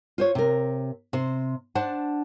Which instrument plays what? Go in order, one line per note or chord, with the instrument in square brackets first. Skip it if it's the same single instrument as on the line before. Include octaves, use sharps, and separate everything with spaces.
[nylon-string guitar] F4 C5 C#5
C3 A#4
C3 C5
D4 C5 F#5 A5